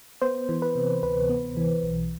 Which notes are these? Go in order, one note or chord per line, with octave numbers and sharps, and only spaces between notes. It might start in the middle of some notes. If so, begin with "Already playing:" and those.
B3 C5
E3
B4
C3
D2 B4
B3
E3
B1